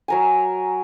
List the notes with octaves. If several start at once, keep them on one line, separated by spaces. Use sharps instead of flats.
F#3 A#4 G#5